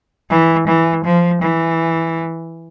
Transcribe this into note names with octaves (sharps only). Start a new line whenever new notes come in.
E3
E3
F3
E3